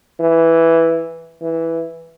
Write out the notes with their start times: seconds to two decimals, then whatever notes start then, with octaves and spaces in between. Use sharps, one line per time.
0.20 E3
1.41 E3